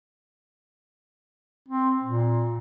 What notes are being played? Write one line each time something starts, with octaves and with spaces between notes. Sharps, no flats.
C4
A#2